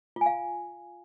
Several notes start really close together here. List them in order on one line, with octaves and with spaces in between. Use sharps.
F4 G#5 F5